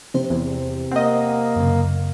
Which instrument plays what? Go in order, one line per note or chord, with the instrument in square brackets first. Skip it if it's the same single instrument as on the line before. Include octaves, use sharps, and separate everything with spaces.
[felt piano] C3 [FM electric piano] G4 C5
[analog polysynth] E2
[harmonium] A#3 [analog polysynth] C4 D#5 [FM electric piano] F#5
[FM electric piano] F#2 C#3